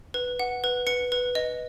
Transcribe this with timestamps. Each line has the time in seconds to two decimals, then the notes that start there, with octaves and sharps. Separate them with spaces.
0.14 B4
0.39 F#5
0.64 B4
0.87 B4 C#7
1.12 B4
1.35 D#5